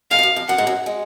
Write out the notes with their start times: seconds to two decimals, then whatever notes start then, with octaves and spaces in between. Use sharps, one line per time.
0.11 G#2 F5
0.19 F2
0.23 F#2
0.36 F2
0.48 F#2 F#5
0.58 G#2
0.67 F#2 F#3
0.86 G#3